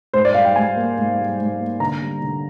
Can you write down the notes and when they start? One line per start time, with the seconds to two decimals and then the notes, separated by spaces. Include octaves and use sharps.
0.13 G#2 C5
0.25 D5
0.34 G3 F5
0.45 G5
0.56 G#2 G#5
0.77 A#3
0.98 G#2
1.19 G3
1.39 G#2
1.60 A#3
1.80 D3 A#5
2.02 G3
2.22 D3